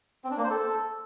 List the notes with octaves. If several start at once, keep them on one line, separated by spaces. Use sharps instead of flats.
C4
D4
A#3
C5
A4